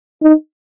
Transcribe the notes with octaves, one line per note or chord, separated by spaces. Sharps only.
D#4